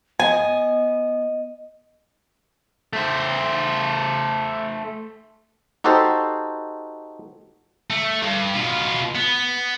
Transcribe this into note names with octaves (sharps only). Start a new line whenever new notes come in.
B3 D#5 G#5
A3 C5
D#4 F#4 G4 A4 C5
A3
G2
B2 F4
B3